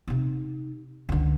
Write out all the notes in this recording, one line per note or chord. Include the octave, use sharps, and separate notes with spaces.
C3 D#4
C#2 D3